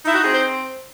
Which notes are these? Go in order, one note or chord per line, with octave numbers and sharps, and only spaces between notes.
D#4 E4
F#4
C4 G#4
C5